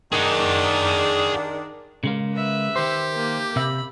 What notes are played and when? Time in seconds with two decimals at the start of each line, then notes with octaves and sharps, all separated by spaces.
0.12 D#3 D4 G#4 F#5
2.04 C#3 G#3 A#3
2.34 B4 E5
2.76 D#3 G4 C5
3.14 A#3
3.56 C3 E5 B5